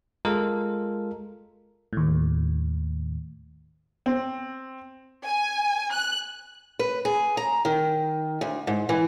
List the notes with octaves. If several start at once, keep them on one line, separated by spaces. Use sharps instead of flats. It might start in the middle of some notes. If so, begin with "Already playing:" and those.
G#3 F4 A4 A#4
D#2 A2
C4
G#5
F#6
B4
G#4
A#5
D#3
D2
G#2
E3